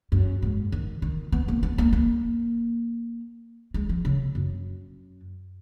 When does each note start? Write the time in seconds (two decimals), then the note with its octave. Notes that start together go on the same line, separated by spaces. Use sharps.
0.12 F#2
0.42 G#2
0.72 D#3
1.02 D#3
1.32 B3
1.48 A#3
1.63 B3
1.78 A#3
1.93 A#3
3.74 G#3
3.89 F3
4.05 C#3
4.35 F#2